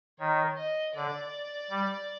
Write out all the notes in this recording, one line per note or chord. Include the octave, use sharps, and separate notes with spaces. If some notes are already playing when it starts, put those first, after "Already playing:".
D#3 C#5
D#5
D3 D5
G3